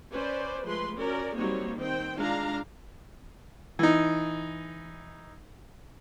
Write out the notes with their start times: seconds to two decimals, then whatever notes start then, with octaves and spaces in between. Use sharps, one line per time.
0.11 C#4 B4 C5 D5
0.65 F3 G#3 A3 B4 C6
0.97 C#4 F#4 A#4 D5
1.37 F#3 G3 A#3 C4 D#4 C#5
1.76 D#3 C4 C5 G5
2.19 G#3 D4 F4 F5 A#5
3.79 E3 D#4